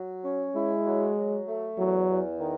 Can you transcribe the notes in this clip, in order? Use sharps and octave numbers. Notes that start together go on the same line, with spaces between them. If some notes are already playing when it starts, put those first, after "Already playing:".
Already playing: F#3
C#4
G#3 E4
F#3
F#3
A3
E2 F#3
E2
D#3